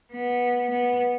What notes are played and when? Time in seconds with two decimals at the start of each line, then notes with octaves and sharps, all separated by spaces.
0.13 B3
0.71 B3